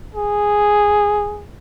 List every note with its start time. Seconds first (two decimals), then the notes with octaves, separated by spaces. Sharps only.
0.15 G#4